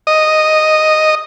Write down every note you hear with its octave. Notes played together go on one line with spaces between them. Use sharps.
D#5